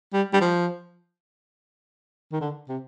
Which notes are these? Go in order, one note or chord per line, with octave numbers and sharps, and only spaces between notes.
G3
G3
F3
D#3
D3
C3